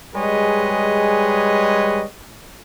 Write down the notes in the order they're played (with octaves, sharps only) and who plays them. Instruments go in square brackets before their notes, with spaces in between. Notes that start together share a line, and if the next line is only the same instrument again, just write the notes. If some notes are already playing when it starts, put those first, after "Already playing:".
[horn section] G3 G#3 G#4 B4 C#5 D#5